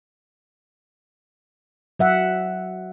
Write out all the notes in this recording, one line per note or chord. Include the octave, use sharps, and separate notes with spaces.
F#3 E5 F#5